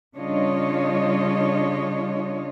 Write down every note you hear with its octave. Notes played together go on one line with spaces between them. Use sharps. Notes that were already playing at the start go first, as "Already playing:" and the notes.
C#3 G3 D4 F4 C#5 D#5